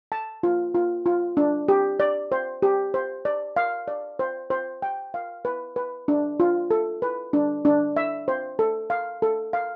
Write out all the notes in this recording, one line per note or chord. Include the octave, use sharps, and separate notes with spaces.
A5
F4
F4
F4
D4
G4
D5
C5
G4
C5
D5
F5
D5
C5
C5
G5
F5
B4
B4
D4
F4
A4
B4
D4
D4
E5
C5
A4
F5
A4
F5